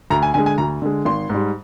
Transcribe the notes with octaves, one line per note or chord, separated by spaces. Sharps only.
D2 A#5
G#5
D3 G#3 G#5
G#5
D2 A#5
D3 G#3
G#1 C6
G#2 G3